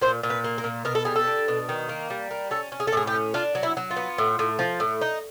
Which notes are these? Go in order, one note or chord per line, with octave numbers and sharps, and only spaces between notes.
A#2 C5
A#2
B4
A#3
A#4
A#2
B2 A#4
A4
G3 G#4
A4
D4
B2
D#3
A#3
G3
A#3
C#4 A4
C#4
G#4
A4
A2 G#4
G4
C#4
D4 F4
F#3
E4
F#3
F4
B3
A2
A2
F3
A2
D#4